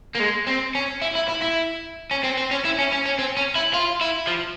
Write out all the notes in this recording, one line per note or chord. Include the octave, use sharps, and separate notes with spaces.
A#3
G#3
C4
C#4
E4
E4
E4
E4
C#4
C4
C4
C#4
E4
C#4
C#4
C#4
C4
C#4
E4
F4
E4
F3